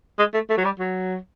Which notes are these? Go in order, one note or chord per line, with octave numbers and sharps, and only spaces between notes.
G#3
A3
A3
F#3
G3
F#3